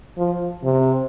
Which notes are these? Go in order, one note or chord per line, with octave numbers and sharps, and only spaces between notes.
F3
C3